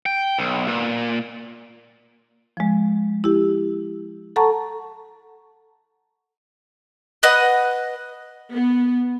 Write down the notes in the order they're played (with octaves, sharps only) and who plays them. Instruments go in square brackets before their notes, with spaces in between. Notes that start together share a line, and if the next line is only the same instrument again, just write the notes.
[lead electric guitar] G5
B1
A#2
[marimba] F3 G#3
E4 G4
A4 F#5 A5 A#5 C#6
[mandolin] B4 D#5 F#5
[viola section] B3